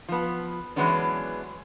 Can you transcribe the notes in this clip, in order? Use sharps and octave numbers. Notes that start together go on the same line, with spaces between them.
F3 B3
E3 F#3 G#3 B3 C#4 D4